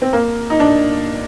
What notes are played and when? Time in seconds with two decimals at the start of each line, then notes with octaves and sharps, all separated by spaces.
0.02 C4
0.13 A#3
0.50 D#4
0.60 D4